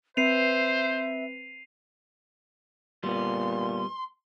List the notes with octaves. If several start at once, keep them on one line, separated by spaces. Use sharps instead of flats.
C4 B4 C5 E5 C7 D#7 F7
A#2 G3 B3 C6